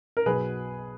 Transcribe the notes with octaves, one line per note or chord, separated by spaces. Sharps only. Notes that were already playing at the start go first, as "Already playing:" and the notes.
A#4
B1 B2 F#3 G#4 B4